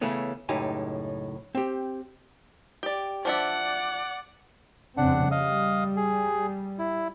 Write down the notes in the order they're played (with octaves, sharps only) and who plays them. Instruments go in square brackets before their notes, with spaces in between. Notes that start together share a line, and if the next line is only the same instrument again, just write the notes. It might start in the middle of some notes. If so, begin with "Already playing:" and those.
[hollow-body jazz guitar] C#3 E3 A3 B3 C#4
C#2 F#2 A2 D#4 G4 G#5
C4 G4
[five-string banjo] G4 D5
[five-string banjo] F3 D4 E5 [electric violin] D5 F#5
[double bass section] F2 C#3 C4 [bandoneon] D4 F#5
[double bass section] G3 [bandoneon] D#5 F5 D#6
[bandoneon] G#4
E4